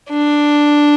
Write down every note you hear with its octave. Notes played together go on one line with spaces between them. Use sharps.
D4